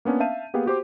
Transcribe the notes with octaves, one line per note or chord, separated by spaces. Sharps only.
A#3 B3 C#4 D4
E5 F5 A5 G6 D#7
A#3 B3 G4 G#4 F5 G5
F#4 G4 C5 D6